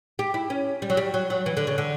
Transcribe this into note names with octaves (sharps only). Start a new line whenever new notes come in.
G4
E4
C#4
G3
F#3
G3
F#3
F#3
E3
D3
C#3
D3